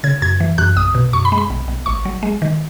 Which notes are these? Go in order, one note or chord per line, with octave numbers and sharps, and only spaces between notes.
C#3 G#6
F#2 G#6
E3
F#2 F#6
B1 D#6
B2
F#2 C#6
B5
G#3
B5
B1
B1
G#1 C#6
F#3
G#3
D#3